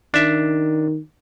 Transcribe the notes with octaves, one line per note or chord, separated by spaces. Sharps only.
D#3 D4 E5